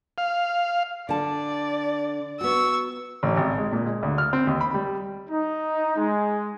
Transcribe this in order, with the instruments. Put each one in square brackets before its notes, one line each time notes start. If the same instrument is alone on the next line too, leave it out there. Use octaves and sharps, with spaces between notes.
[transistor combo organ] F5
[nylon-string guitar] D3 A5 [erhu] D5
[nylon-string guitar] B3 F#4 [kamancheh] C#6 E6
[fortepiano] A1
G#1
G#3
A#2
G#3
D2
F6
C4
D#2
B5
G3
[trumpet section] D#4
G#3